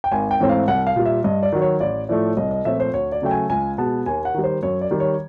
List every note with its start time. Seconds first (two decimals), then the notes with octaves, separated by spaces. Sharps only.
0.04 G5
0.11 G#1 G#5
0.31 G5
0.40 G#2 E3 A3 C4
0.49 F5
0.68 C2 F#5
0.87 F5
0.96 A#2 G3
1.05 E5
1.24 G2 D#5
1.43 D5
1.52 D#3 F#3
1.62 C#5
1.80 A1 D5
2.09 A2 F3 A3 D5
2.37 C2 D#5
2.51 D#5
2.65 A#2 F3 A3 C4 E5
2.80 C5
2.93 D2 C#5
3.12 D5
3.22 C#3 F#3 A3 G5
3.31 G#5
3.50 C#2 G#5
3.78 B2 G#3 B3 A5
4.06 D#2 G#5
4.25 F#5
4.34 D#3 G3
4.44 C5
4.63 F#2 C#5
4.81 D5
4.91 D#3 G3
5.00 C#5